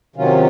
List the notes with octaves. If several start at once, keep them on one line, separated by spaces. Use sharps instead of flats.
C3 D#3 F#3 C#4 F4